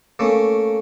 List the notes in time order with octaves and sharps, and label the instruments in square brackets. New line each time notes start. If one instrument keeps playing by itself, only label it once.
[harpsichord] A3 A#3 C#4